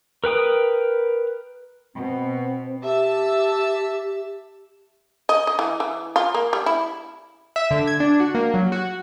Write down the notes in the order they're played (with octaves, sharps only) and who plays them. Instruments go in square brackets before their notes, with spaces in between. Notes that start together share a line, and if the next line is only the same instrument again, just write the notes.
[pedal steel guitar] A#4 B4 G5 D#6
[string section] B2 [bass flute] C4
[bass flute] G4 [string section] E5 A5 E6
[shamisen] D#5
D#5
E3
E3
F4
A#3
G3
E4
[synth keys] E5
D3
G#6
D4
F#4
A#3
F#3
F#4